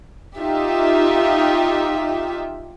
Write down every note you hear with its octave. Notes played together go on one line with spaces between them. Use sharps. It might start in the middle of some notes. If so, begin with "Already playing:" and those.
D#4 F4 G4 E5